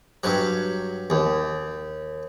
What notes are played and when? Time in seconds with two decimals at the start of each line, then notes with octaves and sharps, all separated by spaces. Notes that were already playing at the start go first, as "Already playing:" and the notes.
0.24 G2 F#3
1.10 D#2